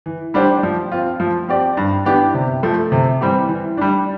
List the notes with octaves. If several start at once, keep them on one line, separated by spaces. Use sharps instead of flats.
E3
G3 D4 G4 C5
F3
C4 F4
F3
C4 G4 D5
G2
E3 B3 D4 G4
C3
F3 A3
C3
E3 G3 C4 G4
E3
G3 D4